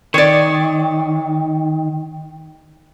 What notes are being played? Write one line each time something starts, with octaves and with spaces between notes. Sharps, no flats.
D#3 C#5 D5